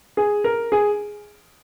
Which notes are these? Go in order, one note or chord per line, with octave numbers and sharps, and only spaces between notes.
G#4
A#4
G#4